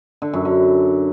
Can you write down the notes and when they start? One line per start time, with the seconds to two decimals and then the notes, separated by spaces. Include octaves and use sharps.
0.22 D3
0.33 F#2
0.45 D3